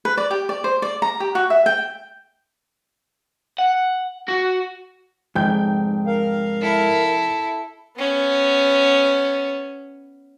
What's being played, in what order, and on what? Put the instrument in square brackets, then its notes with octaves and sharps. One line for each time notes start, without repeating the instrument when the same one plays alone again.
[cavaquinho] B4
D5
G4
D5
C5
D5
A#5
G4
F#4
E5
G5
[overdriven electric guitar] F#5
F#4
[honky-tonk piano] F1 G5 G6 [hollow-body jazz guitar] G#2
[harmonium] A#4 F5
[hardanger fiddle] E4 A4
B3 C#4